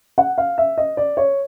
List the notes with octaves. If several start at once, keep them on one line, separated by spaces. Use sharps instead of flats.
F#5
F5
E5
D#5
D5
C#5